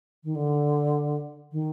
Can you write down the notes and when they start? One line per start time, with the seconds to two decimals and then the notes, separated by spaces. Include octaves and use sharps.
0.24 D#3
0.35 D3
1.52 D#3